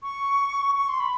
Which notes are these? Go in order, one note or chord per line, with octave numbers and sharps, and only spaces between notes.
C#6
C#6
C6
B5